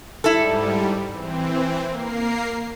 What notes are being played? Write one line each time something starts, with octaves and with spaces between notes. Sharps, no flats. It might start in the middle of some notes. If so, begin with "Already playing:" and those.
G#2 G3 E4 A4
E3 C4
A#3 A#4 C7